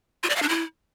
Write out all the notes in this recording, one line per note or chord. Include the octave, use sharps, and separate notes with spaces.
F4
D5
F5
D4
E4